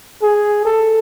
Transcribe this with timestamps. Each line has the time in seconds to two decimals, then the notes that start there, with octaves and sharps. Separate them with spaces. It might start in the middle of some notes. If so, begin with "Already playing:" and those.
0.22 G#4
0.66 A4